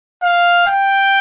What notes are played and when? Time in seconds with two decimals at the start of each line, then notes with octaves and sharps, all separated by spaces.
0.23 F5
0.67 G5